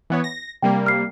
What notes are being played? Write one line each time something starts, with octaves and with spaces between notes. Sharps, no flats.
E3 B3 C#5
A#6
C3 G3 A#3 G5
F6 C7